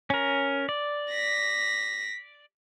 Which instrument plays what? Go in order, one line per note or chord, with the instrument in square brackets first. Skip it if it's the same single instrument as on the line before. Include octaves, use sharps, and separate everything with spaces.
[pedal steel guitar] C#4 A#4
D5
[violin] A#6 B6